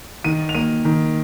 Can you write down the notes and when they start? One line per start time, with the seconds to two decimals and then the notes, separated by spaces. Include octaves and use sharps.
0.25 D#3 D#7
0.49 F7
0.55 A#3 D#7
0.85 D#3